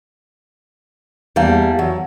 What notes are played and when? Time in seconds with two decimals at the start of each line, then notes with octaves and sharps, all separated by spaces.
1.36 E2 G3 A#3 F5 A5
1.79 F#3